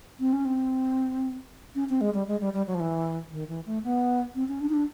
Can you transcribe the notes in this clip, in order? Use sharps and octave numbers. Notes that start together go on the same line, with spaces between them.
C4
C#4
C4
C#4
C4
G#3
G3
G#3
G3
G3
F#3
F3
E3
D#3
E3
A3
B3
C4
C#4
D4
D#4
D4